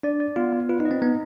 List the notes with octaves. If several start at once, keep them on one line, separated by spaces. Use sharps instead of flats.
D4 D5
D5
B3 F4
B3
F4 B4
D#4
D#5
C4
B3 D#4